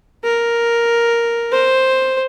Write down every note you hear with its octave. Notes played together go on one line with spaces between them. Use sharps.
A#4
C5